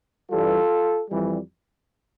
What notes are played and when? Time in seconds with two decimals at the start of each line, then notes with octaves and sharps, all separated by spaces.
0.30 G2 E3 G3 F4 A4
1.10 F2 E3 G3